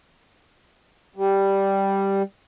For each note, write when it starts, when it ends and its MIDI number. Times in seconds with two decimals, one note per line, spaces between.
1.16 2.22 55